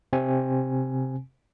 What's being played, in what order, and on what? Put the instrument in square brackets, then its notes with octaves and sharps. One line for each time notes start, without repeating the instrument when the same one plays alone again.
[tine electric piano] C3 C4 G#5